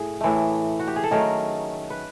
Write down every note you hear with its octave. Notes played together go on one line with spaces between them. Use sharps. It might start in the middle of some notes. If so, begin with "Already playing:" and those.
Already playing: A2 G#4
A2 E3 A3
F#4
G4
G#4
A4
D#3 F#3 A3 C#4 G#4 A#4
B4